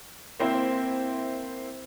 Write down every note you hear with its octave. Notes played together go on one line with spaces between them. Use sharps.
A#3 C4 E4 C5